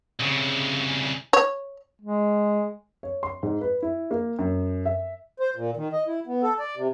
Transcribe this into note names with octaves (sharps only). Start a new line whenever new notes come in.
C2 C#3
C#5
G#3
C#5
C6
G#2
B4
E4
A#3
F#2
E5
C5
A#2
D#3
D#5
E4
B3
A4
D5
C3